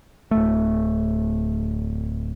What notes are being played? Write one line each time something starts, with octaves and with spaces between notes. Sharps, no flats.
D1 A3